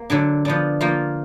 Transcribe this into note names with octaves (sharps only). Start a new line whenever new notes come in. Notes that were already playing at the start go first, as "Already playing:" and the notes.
Already playing: A#3
D3 F#3 D4
F3 B3 D4
F3 A#3 F4